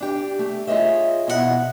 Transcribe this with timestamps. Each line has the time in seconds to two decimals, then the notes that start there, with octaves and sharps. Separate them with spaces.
0.01 D4 G4 D5
0.39 A3
0.67 F4 G#4 C#5 D#5 E5
1.27 F2 B2 E4 F#4 F#5